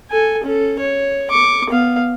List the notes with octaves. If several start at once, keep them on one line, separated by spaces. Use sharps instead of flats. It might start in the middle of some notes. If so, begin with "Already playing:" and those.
A4 G#5
C#4 A4
C#5
C#6 D6
B3 F5